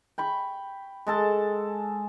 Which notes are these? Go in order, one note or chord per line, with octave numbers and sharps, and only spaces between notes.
G5 B5 C#6
G#3 A4 A5